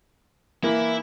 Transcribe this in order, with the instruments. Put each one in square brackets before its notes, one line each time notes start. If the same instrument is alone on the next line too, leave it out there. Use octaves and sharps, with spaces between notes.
[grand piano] E3 A#3 [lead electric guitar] E4